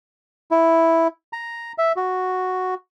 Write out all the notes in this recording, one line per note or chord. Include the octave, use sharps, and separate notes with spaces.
E4
A#5
E5
F#4